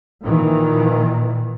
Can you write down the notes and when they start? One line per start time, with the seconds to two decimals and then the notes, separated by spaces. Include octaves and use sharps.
0.23 A#2 D#3 E3